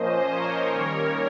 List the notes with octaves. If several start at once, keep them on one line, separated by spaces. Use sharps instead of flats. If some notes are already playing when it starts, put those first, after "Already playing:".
Already playing: A#2 F3 A#3 C#4 C5 D#5
A#4 C#5
D#3 G3 A#3 C#4 A#4 C#5